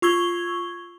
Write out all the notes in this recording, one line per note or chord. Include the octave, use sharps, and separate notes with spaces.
F4 C#6 E6 G#6 G7